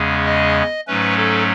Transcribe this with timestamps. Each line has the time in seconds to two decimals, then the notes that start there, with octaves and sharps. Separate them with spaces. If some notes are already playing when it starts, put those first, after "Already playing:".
Already playing: E2 C#3 G#3 C#4
0.26 D#5
0.87 G#2 F#3 A3 C#4 B4
1.17 A4